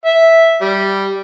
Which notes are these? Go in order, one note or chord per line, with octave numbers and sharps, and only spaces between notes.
E5
G3